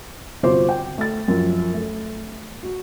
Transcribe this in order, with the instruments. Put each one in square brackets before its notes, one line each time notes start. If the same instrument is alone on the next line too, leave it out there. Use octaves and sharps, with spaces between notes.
[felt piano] G1 C3 F4 F#4 C5 D6
G5
A3 A6
F#2 F3
A3
F#4